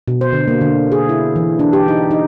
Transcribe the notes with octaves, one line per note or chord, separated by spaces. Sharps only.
B2
C5
D3
A#3
D3
G#4
E4
E3
D4
G4
D#4
D#4